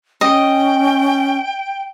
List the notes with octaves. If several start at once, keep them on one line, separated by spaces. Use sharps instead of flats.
C#4 D#5 G5